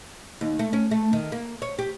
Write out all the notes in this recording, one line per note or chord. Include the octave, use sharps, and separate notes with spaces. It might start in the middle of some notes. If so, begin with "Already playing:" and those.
D#2
A3
C#4
A3
D#3
A#3
C#5
G4